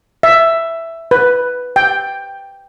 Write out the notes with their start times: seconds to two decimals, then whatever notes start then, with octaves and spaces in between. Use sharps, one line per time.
0.23 E5
1.11 B4
1.76 G5